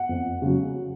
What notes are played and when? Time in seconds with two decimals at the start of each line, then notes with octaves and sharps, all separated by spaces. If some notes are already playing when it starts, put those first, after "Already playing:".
Already playing: F#5
0.09 F2
0.42 C#3 F#3